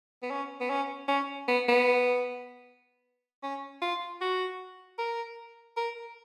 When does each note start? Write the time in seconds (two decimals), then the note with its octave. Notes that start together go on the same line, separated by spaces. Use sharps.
0.23 B3
0.30 C#4
0.61 B3
0.70 C#4
1.08 C#4
1.48 B3
1.69 B3
3.43 C#4
3.82 F4
4.21 F#4
4.98 A#4
5.77 A#4